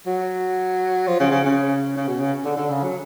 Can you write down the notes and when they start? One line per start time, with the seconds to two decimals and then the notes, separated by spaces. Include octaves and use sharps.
0.06 F#3
1.07 F3
1.20 C#3
1.31 C#3
1.45 C#3
1.97 C#3
2.08 B2
2.20 C#3
2.45 D3
2.57 D3
2.70 C#3
2.83 F#3